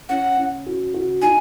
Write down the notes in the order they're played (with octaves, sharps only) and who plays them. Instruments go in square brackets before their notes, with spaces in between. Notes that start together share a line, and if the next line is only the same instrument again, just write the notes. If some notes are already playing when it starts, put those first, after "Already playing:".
[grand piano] C#4 [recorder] F#5
[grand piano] C#4
F#4
F#4
[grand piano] D#4 [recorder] G#5